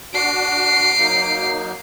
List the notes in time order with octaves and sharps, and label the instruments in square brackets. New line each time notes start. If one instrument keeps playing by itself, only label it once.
[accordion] D4 F#4 [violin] C7 D7
[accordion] F#3 A#3 D#4